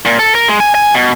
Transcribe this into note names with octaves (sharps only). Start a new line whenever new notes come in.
A#2
A4
A#4
G#3
G#5
G#5
B2